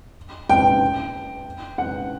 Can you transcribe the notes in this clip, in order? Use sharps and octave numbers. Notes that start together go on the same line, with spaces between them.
G5
F#5